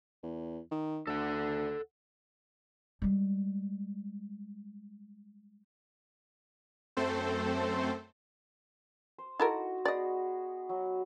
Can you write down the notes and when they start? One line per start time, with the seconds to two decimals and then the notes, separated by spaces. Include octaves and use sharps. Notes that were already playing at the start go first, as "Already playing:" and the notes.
0.23 E2
0.71 D#3
1.07 D2 A4 F#5
3.02 G3 G#3
6.97 F#2 A3 C4 A4 C5
9.18 C5
9.40 D#4 E4 F#4 A4 A#4 F#5
9.85 B3 F#4 G#4 D5 D#5
10.69 F#3